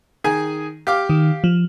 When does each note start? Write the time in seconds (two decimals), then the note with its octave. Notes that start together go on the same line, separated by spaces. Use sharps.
0.24 D#3 G#4 G#5
0.87 G4 F5 D6
1.10 D#3
1.44 F3